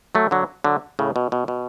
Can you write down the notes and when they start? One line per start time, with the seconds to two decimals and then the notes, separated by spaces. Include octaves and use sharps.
0.15 F#3 A3
0.31 D3 F#3
0.64 D3 F#3
0.99 A2 C#3
1.16 B2
1.32 B2
1.48 B2